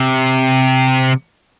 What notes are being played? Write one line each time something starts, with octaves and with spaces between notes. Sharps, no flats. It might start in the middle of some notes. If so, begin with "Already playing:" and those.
Already playing: C3